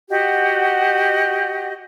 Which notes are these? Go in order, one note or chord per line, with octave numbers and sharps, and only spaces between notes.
F#4 G4 D#5 F#5